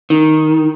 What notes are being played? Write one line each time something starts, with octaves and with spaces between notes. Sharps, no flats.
D#3